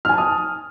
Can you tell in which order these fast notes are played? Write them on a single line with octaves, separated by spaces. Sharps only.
F6 G#5 A5 D#6